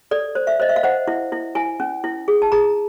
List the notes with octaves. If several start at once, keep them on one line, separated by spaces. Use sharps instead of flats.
A4 D5
C5
E5
C5 D#5
E5
F5
C5 F#5
E4
E4
E4 G#5
C#4
E4
G#4
A5
G#4 A#5